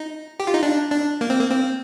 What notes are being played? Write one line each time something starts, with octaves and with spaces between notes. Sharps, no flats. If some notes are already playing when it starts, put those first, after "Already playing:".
Already playing: D#4
G4
F4
D#4
D4
D4
A#3
C4
A#3
C4